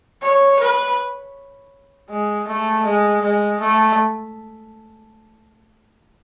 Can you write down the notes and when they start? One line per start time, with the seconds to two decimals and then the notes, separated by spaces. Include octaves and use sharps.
0.22 C#5
0.60 B4
2.10 G#3
2.47 A3
2.85 G#3
3.22 G#3
3.60 A3